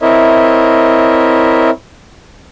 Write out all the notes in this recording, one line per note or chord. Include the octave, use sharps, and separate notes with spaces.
C4 E4 A#4 C#5 D#5 E5